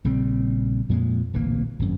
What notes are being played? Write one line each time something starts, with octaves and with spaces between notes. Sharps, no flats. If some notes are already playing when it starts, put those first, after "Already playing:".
A#1 C#3 G3 C4
F2 A#2 G#3
D1 A#1 E3 A#3
G#1 F#2